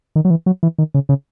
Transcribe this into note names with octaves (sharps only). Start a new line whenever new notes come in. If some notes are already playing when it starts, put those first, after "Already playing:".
D#3
F#3
E3
F#3
E3
D#3
C#3
C#3